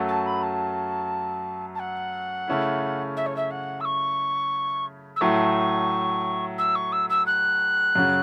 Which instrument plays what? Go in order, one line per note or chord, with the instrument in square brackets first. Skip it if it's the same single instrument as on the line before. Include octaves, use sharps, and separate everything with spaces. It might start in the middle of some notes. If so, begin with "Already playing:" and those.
Already playing: [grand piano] F#2 F#3 A3 F#4
[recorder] A5
B5
A5
A5
F#5
[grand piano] C#3 A3 C#4 E4
[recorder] E5
C#5
E5
F#5
E6
C#6
E6
[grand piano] A2 F#3 A3 [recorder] C#6
[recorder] E6
C#6
E6
E6
F#6
[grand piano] F#2 C#3 F#3 C#4 F#4